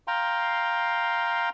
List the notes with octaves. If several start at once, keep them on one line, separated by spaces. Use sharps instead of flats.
F5 G5 A#5 C6